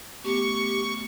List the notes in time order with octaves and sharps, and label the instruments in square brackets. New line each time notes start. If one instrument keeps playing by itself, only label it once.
[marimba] A3 B3 C#4 [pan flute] G4 [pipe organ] C#6